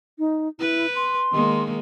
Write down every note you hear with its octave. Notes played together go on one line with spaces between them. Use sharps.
D#4
E4 B4
C6
D#3 G#3 A#3